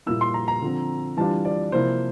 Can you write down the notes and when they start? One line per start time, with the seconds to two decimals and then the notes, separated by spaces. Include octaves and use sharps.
0.06 A#2 G3 A#3 E4 E6
0.21 C6
0.34 A#5
0.48 A#5
0.62 D3 F3 C4
1.17 E3 G3 D4 F4 A5
1.45 D5
1.72 C3 F3 A#3 E4 C5